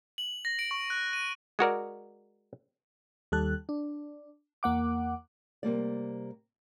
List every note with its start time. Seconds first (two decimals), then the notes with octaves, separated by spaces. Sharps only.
0.18 F#7
0.45 A#6
0.59 D7
0.71 C#6
0.90 F#6
1.13 D#7
1.59 G#3 F#4 A#4 D5
3.32 D#2 G3 A4 F#6
3.69 D4
4.63 E2 A#3 F#5 D6
5.63 C3 G3 A#3 D5